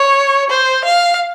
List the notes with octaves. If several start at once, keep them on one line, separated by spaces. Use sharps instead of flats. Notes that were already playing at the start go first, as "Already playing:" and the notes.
Already playing: C#5
C5
F5